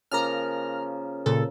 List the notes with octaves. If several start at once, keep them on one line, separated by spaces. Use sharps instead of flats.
C#3 F3 A#3 A#5 F6
A#2 C#3 A4